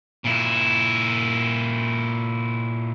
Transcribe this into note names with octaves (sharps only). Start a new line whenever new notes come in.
A#2 E4